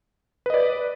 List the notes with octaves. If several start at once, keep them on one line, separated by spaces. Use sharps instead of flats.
B4 D5 D#5